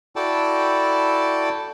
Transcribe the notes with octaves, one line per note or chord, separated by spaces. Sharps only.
E4 F#4 A4 D5 G5 A5